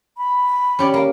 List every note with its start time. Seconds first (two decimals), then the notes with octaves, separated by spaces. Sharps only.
0.17 B5
0.79 C#4 G4 D5
0.94 A#3